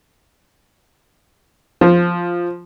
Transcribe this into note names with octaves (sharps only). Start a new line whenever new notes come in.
F3